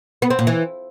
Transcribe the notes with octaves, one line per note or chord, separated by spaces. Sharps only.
B3
C4
A#2
E3